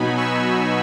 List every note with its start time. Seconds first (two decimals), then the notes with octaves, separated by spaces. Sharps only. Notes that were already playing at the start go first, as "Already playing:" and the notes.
Already playing: B2 F#3 B3 D#4 G#5 B5
0.17 C#6 E6